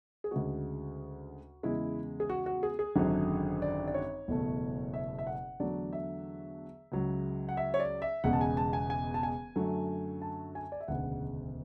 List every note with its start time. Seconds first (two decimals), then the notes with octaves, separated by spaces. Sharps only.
0.24 G#4
0.31 D2 C#3 G#3 F#4
1.63 E2 C#3 G#3 E4
2.20 G#4
2.29 F#4
2.46 F#4
2.63 G#4
2.79 G#4
2.96 G#1 F#2 D3 F#3
3.62 D5
3.87 D5
3.94 C#5
4.28 F#1 E2 B2 A3
4.94 E5
5.18 E5
5.27 F#5
5.60 E2 D3 F#3 A3 D5
5.93 E5
6.92 C#2 C#3 F#3
7.49 F#5
7.57 E5
7.74 C#5
7.80 D5
8.02 E5
8.24 E1 E2 C#3 G#3 F#5
8.33 A5
8.41 G#5
8.57 A5
8.73 G#5
8.90 G#5
9.14 A5
9.23 G#5
9.56 F#2 D3 F#3 A3
10.22 A5
10.55 G#5
10.72 D5
10.80 E5
10.88 E1 D2 C#3 F#5